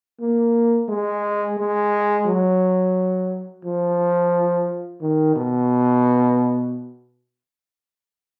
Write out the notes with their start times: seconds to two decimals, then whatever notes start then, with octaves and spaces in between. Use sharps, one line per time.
0.20 A#3
0.89 G#3
1.57 G#3
2.26 F#3
3.64 F3
5.01 D#3
5.36 B2